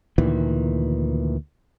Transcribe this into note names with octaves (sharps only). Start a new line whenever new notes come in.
D2 A#2 D#3 E3